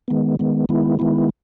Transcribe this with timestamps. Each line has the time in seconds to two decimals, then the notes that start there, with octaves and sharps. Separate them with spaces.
0.08 D#3 G#3 B3
0.39 D#3 G#3 B3
0.69 D#3 G#3 B3 E4
0.99 D#3 G#3 B3 E4